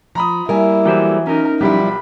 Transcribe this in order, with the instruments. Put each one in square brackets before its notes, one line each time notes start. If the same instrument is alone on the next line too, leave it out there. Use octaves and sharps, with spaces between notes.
[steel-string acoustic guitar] F3 [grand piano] A#5 B5 D#6
[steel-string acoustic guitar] G3 A#3 A#4 [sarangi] E4 [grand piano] E5 G#5
[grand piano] E3 F#3 [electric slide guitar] A3 G4 C5
[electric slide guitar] C#4 D#4 [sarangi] A#4
[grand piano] B1 G4 [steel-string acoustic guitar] F3 G3 E4 [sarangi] B5